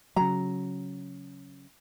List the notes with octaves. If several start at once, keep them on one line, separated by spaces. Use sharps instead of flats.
C#3 F#3 A#5